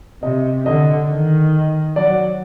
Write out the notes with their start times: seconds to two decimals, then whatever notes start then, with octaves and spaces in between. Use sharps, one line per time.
0.23 C3 D#5
0.66 D3 D#5
1.09 D#3
1.96 F#3 D5